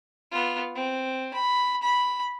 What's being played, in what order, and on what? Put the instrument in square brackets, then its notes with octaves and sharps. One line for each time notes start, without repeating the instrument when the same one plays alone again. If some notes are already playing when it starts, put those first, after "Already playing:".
[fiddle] B3 F4
C4
B5
B5